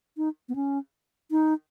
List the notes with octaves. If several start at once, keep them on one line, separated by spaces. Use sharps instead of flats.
D#4
B3
C#4
D#4